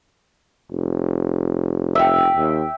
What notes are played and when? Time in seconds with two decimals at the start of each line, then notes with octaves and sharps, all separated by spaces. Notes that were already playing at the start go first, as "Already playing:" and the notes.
0.71 F1
1.95 E5 G5
2.36 D#2